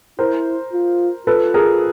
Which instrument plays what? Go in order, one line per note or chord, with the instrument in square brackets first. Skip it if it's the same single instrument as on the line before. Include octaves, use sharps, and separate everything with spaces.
[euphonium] E4 [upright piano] A#4 C5
[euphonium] F4
[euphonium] F4 [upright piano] A4 B4
[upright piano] G#4 A#4